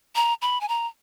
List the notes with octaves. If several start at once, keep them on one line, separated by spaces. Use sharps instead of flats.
A#5
B5
G#5
A#5